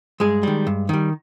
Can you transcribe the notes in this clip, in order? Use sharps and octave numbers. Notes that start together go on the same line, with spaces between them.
G2 G#3 G#4
D#3 G3
G2
D#3 G3